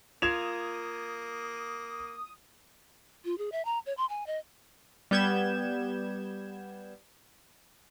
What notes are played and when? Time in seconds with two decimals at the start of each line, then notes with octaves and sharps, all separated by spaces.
0.22 A#3 F4 A#4 F5 D#6 G#6 E7 F7
3.25 F4
3.38 G#4
3.52 E5
3.65 A#5
3.86 C#5
3.97 C6
4.09 G#5
4.27 D#5
5.11 G3 B3 G6 G#6 E7